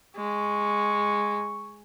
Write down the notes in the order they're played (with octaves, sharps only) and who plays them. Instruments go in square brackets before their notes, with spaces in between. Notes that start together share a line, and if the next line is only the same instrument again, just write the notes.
[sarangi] G#3 [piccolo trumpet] C#6